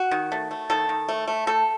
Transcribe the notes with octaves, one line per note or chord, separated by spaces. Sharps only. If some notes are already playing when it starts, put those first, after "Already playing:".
Already playing: F#4
D#3
A3
A3
D#3 A4
D#3
A3
A3
A3 A4